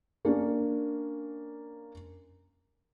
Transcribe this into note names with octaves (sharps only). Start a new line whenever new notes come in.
A#3 C#4 D4